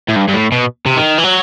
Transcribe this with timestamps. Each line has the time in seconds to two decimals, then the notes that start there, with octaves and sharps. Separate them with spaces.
0.09 A2
0.16 G2
0.28 G2
0.34 A2
0.52 B2
0.86 C3
0.97 D#3
1.18 E3
1.24 F#3